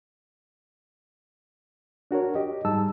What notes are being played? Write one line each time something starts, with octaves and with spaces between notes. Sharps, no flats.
D4 F#4 A#4 C#5
G4 D#5
G#2 G3 D#4 G#4 A5 E6